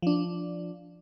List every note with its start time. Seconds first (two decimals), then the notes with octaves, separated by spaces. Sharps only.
0.02 F3 D4